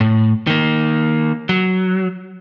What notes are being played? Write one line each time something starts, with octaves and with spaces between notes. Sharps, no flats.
A2
D#3 A#3
F#3